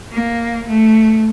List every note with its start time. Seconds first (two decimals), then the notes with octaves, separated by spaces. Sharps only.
0.12 A#3
0.68 A3